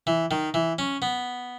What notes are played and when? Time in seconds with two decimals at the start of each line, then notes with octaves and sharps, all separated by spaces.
0.07 E3
0.31 D#3
0.54 E3
0.79 C#4
1.02 B3